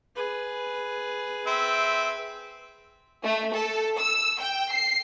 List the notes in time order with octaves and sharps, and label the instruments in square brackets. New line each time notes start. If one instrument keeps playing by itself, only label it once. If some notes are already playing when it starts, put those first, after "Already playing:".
[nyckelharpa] G#4 B4
[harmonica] C4 E5
[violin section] A3
A4
E6
G5
C7